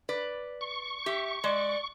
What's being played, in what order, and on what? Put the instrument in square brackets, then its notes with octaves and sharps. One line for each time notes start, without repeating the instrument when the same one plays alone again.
[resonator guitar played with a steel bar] B4 D5
[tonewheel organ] C#6
[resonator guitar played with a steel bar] G4 [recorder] E5
[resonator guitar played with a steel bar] G#3 [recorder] D5